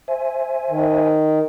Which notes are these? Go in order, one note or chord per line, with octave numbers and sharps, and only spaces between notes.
C5 E5 G#5
D#3